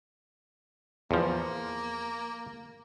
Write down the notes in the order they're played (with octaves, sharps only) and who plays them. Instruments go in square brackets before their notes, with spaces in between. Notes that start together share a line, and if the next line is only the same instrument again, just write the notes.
[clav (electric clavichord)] E2 F3 [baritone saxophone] A#3